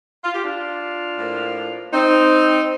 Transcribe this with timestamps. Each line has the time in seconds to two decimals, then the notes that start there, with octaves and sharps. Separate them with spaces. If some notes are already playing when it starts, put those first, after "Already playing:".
0.24 F4
0.34 G4
0.43 D4 F4
1.17 A2 F3 A#3
1.93 C4 D#4